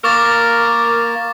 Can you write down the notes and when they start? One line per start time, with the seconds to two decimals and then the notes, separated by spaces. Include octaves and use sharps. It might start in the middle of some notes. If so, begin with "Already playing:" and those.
0.04 A#3 A#4 C#6 D6 A6